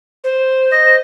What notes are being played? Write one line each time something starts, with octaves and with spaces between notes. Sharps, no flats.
C5
D#5